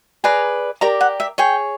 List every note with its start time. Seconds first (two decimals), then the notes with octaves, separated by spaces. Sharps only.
0.24 G#4 B4 D5 A#5
0.81 G4 A#4 D5 A#5
1.01 F#5
1.20 E5
1.38 G#4 C#5 G5